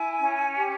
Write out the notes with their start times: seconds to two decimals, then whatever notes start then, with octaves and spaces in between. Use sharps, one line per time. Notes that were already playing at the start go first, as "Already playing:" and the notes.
Already playing: E4 G#5
0.19 C#4
0.56 G4